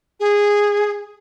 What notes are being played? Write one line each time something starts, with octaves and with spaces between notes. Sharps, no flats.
G#4